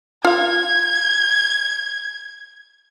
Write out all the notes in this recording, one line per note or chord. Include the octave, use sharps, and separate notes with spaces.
F4 F5 G#6